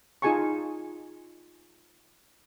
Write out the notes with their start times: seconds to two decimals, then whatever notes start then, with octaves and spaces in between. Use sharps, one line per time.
0.22 D#4 F4 G#4 G#5 A5 C#6